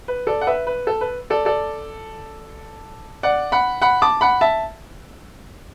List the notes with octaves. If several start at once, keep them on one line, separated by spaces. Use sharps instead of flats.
B4
A4 D5
F#5
B4 E5
B4
A4
B4
A4 D5
A4 D5
D5 F#5
F#5 B5
F#5 B5
A5 D6
F#5 B5
E5 A5